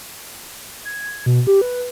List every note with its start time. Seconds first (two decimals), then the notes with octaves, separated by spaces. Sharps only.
0.85 G#6
1.26 B2
1.47 G4
1.61 B4